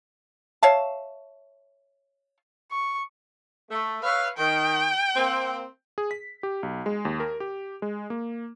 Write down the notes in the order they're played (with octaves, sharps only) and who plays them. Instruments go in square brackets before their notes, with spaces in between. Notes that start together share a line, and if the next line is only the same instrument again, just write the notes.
[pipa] C#5 E5 F5 A5
[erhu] C#6
[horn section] A3
[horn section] B4 C#5 E5 [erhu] F5
[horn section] D#3 [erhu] G5
[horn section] A#3 C4
[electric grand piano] G#4
B6
G4
B1
G#3
D#2
A#4
G4
G#3
A#3